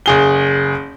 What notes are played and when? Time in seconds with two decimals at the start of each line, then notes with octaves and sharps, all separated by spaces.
0.06 F#1 G#4 G7